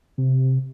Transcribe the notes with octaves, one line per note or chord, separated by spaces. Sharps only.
C3